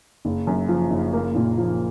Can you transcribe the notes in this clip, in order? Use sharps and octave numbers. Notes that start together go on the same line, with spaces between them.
F#1
F#2
F3
F#1
A#3
A#2
F3